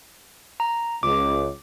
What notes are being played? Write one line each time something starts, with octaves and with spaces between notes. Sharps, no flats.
A#5
C#2 D6